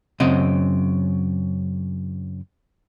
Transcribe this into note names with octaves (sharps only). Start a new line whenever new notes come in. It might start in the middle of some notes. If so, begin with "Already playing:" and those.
F#2 C#3 C4 D#5